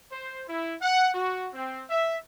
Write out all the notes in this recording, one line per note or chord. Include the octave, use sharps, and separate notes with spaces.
C5
E4
F#5
F#4
C4
E5